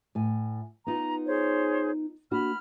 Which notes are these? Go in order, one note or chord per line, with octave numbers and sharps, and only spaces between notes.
A2 G#5
B3 D#4 F4 A#5
G#4 C5 C#5
A#3 D4 F#4 B5 F6